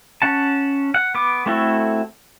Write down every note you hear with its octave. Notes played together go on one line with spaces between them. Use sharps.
C#4 F#5 A5
F#5
B3 D6
A3 C4 E4 F#4 A4